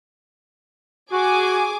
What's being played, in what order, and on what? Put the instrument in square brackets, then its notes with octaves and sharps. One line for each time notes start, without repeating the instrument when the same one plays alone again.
[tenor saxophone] F#4 [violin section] G#4 G#5 D6